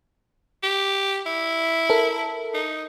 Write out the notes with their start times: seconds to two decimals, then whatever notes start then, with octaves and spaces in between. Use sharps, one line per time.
0.63 G4
1.26 E4
1.90 A4 A#4
2.54 D#4